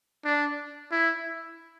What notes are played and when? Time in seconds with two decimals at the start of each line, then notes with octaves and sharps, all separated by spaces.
0.25 D4
0.91 E4